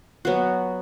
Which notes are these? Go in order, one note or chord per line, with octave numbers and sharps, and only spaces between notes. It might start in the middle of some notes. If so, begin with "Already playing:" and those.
F#3 B3 F#4